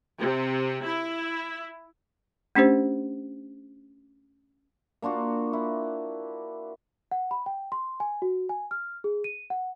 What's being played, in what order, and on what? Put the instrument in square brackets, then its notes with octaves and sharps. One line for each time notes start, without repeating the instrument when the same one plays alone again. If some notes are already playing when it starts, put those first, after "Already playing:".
[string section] C3
E4
[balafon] A3 C#4 D4 G4 C5
[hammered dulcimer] A#3 D4 F4 F#4
E4
[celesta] F#5
B5
G5
C6
G#5
F#4
G#5
F6
G#4
D#7
F#5